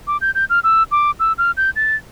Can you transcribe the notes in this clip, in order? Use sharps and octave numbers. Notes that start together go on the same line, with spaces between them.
D6
G6
G6
F6
E6
D6
E6
F6
G6
A6